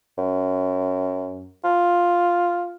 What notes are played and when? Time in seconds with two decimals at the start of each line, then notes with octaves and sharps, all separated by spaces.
0.18 F#2
1.64 F4